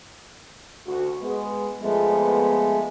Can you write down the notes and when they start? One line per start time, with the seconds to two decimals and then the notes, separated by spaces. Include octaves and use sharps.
0.87 D2 F#4
1.21 G#3 B3
1.81 F2 G#3 A3 B3